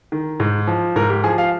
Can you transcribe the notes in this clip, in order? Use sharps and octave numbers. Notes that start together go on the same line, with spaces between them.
D#3
G#2
F3
G#2 A#4
G4
F3 G#4
F5